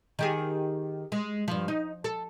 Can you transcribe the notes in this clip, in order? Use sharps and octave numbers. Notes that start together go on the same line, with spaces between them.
D#3 G4 G#4
G#3
G2 F3
D#4
A4